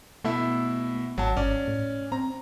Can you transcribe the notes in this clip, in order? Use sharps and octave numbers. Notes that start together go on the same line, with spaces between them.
B2 A3 E4 E5
G#1 F#3 A5
G1 C#4 D5
A2
C4 A#5